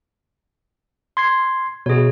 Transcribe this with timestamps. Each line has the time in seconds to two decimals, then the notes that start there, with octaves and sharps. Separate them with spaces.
1.17 C6 G#6 C7
1.86 B2 G#4 C#5